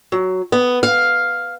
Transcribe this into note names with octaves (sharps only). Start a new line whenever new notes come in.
F#3
B3
F5